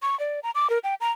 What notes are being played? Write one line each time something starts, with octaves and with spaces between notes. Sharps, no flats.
C#6
D5
A#5
D6
A#4
G5
A#5